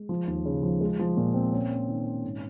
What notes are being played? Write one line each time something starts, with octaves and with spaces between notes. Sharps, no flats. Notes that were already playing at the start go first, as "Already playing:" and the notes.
Already playing: G#3
F3
D#2
C#3
F3
G#3
F3
A#2
C4
C#4
C#4
D#3
C#4
G#2